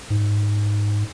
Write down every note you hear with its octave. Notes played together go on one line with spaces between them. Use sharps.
G#2